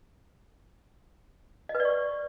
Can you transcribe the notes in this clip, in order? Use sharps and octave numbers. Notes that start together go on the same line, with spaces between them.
D#5
B4
D5
C#6